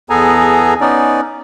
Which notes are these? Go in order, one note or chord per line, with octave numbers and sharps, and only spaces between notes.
E2 B3 G#4 A4 G#5 A#5
B3 C#4 D#4 D5